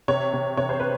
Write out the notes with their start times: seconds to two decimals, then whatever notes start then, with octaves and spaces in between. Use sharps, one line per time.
0.08 C3 C#5
0.33 C3
0.57 C3 C#5
0.69 C5
0.80 B4